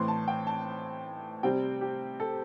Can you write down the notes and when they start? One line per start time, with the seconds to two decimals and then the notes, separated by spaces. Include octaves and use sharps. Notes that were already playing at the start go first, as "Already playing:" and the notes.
Already playing: A2 E3 C4 C6
0.08 A5
0.28 G5
0.47 A5
1.43 C3 G3 C4 G5
1.81 G4
2.20 A4